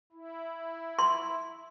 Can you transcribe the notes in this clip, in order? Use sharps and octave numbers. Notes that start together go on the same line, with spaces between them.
E4
C6